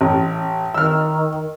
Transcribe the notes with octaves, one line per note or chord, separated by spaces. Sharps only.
A1
D#3 E6 F6